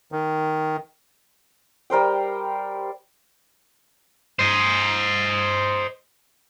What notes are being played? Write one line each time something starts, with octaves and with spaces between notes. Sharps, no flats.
D#3
G3 A#4 C5 G5
C5 D#5